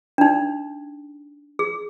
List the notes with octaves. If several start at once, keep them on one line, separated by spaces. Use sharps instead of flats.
D4 D#4
G#4